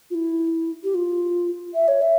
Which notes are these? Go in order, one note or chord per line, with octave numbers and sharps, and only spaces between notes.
F4
E4
G4
F4
E5
C#5
E5